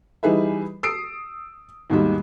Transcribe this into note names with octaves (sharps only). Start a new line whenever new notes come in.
E3 G3 D#4 G#4 B4 E5
D#6 E6 C7 D7
D#2 G#2 B2 G3